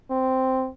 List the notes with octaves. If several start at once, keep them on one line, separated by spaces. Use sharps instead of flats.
C4